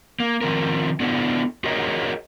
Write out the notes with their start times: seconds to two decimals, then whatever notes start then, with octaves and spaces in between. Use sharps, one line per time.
0.20 A#3
0.41 D#3 F3 C4 A#4
1.00 B3 D4 E4 A4
1.64 F#4 G#4 A#4 C#5 D#5